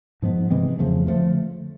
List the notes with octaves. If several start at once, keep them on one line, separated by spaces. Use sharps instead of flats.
G#2 F3 G#3 B3
C3 E3 G#3 C4
F2 C#3 F3 A3
D3 F3 A3